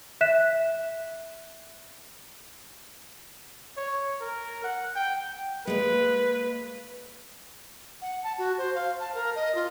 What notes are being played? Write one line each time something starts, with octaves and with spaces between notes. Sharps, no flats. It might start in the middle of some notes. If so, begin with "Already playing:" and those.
E5 F#6 B6 E7
C#5
A#4
F#5
G5
G#3 A#3 B4
F#5
A5
F#4
C5
F5
A5
A#4
D#5
F4